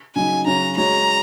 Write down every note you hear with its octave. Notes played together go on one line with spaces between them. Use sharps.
C#3 F#3 D#4 G#5
C#3 F#3 C#4 F#4 A#5
G#3 F#4 C#5 A#5